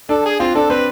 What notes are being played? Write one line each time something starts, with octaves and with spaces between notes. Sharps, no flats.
D4 A4
G#4
C4 F4
D4 A4
C4 B4